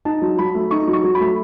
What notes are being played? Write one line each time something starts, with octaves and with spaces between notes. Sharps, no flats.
D#4 A5
F#3
F#3 B5
A3
D#4 C#6
F#3
C#6
F#3
B5
A3